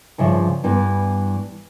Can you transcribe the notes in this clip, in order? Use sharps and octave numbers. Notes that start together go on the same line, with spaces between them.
G2 C#3 F3 E5
G2 E3 G3 B3